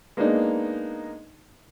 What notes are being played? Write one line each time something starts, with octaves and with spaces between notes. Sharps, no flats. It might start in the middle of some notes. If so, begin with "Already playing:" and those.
G#3 A#3 B3 D4 D#4